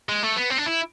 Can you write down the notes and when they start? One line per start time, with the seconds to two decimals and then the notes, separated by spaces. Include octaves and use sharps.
0.09 G#3
0.23 A3
0.36 B3
0.50 C4
0.58 D4
0.66 E4